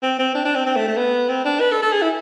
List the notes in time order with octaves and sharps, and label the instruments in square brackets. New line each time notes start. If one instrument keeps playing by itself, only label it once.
[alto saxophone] C4
C4
D4
D4
C4
C4
A3
A3
B3
C4
D4
B4
A4
A4
G#4
E4